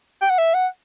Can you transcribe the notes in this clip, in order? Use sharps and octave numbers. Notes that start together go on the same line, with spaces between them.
G5
F#5
E5
F#5